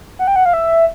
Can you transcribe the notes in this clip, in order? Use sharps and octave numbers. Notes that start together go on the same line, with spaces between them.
F#5
G5
F#5
F5
E5